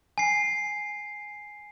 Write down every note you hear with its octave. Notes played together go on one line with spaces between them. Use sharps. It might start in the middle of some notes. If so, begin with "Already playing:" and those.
G#5 C7